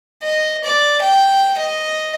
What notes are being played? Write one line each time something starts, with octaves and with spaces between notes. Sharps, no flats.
D#5
D5
G5
D#5